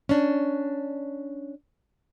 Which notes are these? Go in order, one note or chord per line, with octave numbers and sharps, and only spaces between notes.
C#4 D4